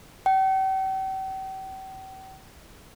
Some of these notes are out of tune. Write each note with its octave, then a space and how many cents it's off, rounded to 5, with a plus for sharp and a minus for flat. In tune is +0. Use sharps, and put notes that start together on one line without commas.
G5 -40